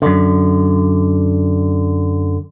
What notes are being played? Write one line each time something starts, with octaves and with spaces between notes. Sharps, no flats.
F#2 D3